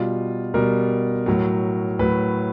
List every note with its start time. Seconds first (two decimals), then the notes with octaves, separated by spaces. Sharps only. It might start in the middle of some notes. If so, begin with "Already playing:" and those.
Already playing: B2 G3 F4
0.54 B2 G3 A#4
1.26 A2 F#3
1.99 A2 F#3 B4